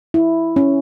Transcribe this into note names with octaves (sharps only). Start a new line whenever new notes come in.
E4
C#4